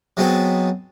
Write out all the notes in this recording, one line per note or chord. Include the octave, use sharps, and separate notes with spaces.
F#3 G#3 B3 C4 A4